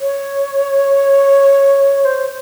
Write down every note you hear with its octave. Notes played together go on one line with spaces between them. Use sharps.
C#5
C5